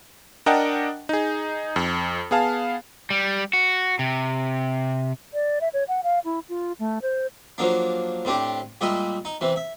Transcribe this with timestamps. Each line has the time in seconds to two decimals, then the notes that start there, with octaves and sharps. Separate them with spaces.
0.46 D4 A#4 D#5 F#5 G5 A5
1.09 D#4 G#4
1.76 F2
2.31 B3 G#4 F5 A5
3.10 G3
3.53 F#4
3.99 C3
5.34 D5
5.61 E5
5.73 C#5
5.88 F#5
6.03 F5
6.25 E4
6.49 F4
6.79 A3
7.02 C5
7.58 F3 F#3 A#3 D4
8.25 A2 C4 D4 G4
8.81 A#2 G3 G#3 D#5 E5
9.25 D#4
9.41 C3 E3
9.56 E5